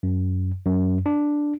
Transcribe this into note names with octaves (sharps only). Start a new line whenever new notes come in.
F#2
F#2
D4